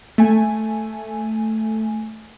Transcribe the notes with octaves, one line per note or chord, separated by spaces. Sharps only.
A3 G#5